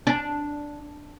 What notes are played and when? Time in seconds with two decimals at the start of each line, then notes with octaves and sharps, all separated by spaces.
0.07 D4